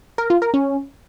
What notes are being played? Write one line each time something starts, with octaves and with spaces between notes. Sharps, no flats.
A#4
F4
A#4
C#4